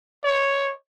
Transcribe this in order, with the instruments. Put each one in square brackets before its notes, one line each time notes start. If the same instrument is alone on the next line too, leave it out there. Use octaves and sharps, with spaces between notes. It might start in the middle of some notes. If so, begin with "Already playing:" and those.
[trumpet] C#5